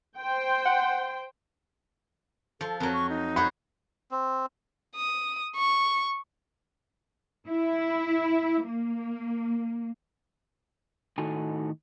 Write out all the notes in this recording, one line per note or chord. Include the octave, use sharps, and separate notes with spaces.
C5 G5
F#5
F3 A4
F2 F#3 A#4
C#6
D#4
F#4 C5 C#5 B5
C4
D#6
C#6
E4
A#3
A2 D#3 D#4 F#4 A4 G#5